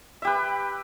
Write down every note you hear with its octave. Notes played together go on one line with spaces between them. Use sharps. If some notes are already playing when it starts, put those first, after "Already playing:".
G4 B4 E5